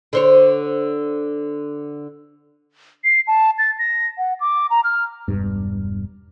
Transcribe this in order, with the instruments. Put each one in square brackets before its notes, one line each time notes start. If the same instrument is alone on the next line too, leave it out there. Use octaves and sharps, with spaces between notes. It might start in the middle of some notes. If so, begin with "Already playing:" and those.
[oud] D3 C5 C#5
[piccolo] C7
A5
A6
A#6
F#5
D6
A#5
F6
[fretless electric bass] E1 G2